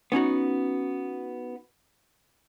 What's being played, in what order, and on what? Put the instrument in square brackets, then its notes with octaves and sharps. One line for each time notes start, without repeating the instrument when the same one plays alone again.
[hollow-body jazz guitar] B3 C#4 D#4 F#4